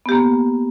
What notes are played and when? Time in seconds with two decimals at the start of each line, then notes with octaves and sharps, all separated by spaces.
0.06 B3
0.09 G4
0.12 A#3